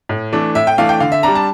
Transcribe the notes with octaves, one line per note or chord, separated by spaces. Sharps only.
A2
E3 A3 D4
A2 E5
G5
E3 A3 D4 F5
G5
D3 F5
E5
G3 D4 A#5
A5